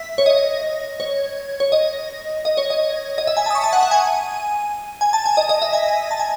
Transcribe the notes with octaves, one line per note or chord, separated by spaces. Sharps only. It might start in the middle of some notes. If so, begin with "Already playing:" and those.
Already playing: E5
C#5
D#5
C#5
C#5
D#5
D#5
C#5
D#5
D#5
E5
G#5
A5
D#6
C#6
A5
F#5
F#5
G#5
G#5
A5
G#5
D#5
D#5
E5
G#5
A5
G#5